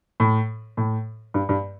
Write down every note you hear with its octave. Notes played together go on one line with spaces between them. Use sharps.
A2
A2
G2
G2